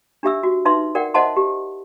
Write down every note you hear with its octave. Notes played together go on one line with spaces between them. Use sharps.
D4 G4 E5 E6
F#4
D#4 B4 E5 C6
A#4 D5 F#5 G5
C5 D#5 E5 F#5 A5 C6
G4